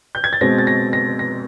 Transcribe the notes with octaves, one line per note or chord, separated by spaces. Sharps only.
G6
G#6
A6
B2 G#3 C4 A#6
A6
A#6
A#6
A#6